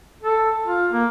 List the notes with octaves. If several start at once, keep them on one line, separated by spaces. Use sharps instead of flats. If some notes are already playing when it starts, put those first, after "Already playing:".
A4
F4
A#3